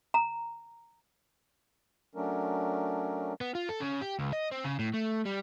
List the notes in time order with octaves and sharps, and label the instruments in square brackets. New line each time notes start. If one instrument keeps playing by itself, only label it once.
[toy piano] A#5
[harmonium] F#3 A3 C#4 D4 A#4
[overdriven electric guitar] B3
F4
A4
C#3
G4
C#2
D#5
C4
C#3
A2
A3
G3